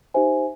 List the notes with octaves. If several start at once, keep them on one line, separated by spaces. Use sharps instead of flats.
D#4 G4 C5 E5 G#5